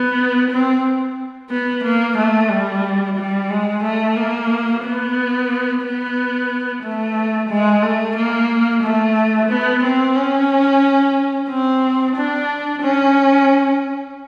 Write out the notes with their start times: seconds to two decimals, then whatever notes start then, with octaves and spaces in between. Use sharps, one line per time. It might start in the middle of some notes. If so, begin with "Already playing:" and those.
Already playing: B3
0.51 C4
1.50 B3
1.84 A#3
2.17 A3
2.50 G3
3.17 G3
3.50 G#3
3.84 A3
4.17 A#3
4.84 B3
5.82 B3
6.83 A3
7.49 G#3
7.82 A3
8.16 A#3
8.83 A3
9.49 B3
9.83 C4
10.16 C#4
11.49 C4
12.16 D4
12.82 C#4